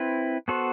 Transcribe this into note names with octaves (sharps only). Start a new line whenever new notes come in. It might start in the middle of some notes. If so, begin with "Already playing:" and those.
Already playing: C4 E4 B4
B3 F#4 A4 C5